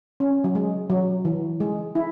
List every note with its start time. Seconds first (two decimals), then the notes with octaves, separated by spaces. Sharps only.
0.20 C#4
0.44 F#3
0.55 G#3
0.90 F#3
1.25 E3
1.60 G#3
1.95 E4